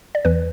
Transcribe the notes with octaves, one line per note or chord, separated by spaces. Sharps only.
D5
E2 E3 B4